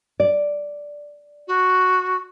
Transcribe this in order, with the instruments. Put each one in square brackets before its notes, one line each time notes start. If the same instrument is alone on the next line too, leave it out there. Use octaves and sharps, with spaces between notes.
[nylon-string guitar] D5
[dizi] F#4